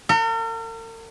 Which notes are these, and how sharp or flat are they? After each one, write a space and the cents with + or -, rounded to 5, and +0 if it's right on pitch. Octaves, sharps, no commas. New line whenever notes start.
A#4 -45 F#5 +0